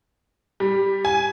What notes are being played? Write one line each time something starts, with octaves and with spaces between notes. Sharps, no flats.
G3
G#5